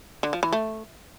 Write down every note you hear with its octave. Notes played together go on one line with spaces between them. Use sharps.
D3
F3
E3
A3